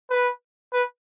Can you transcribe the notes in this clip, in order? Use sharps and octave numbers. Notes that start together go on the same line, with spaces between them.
B4
B4